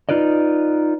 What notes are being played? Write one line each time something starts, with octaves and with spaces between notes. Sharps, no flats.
D#4 F4 B4 D5 D#5